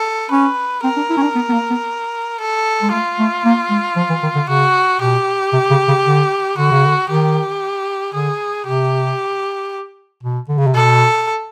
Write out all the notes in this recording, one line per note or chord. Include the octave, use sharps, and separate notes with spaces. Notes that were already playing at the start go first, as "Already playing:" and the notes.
Already playing: A4
C#4 B4
C4 A#4
D4
E4
C#4
D4
B3
B3
A#3
B3
A4
G#3
A3 F4
A3
A#3
G#3
F3
E3
D#3
D3
C#3 F#4
B2 G4
C3
C#3
C#3
D3
D3 F#4
C#3
D3
D#3 G4
D3 G#4
C3 G4
B2
D3
C#3
C3
B2 A4